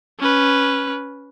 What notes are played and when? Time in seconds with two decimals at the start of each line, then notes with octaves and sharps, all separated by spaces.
0.20 C#4 B4